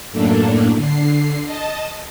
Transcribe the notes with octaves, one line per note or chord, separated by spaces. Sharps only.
F#2 A2 A3 A#3 D4
D3 C7
D#5 A5